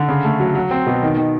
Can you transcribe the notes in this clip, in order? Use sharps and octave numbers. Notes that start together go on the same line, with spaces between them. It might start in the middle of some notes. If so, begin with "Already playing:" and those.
Already playing: D3
C#3
A3
F#3
F#3
C4
B2
D#3
D#3